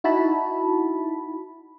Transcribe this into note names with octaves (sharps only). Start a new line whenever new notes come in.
D#4 E4 F#4 A5 B5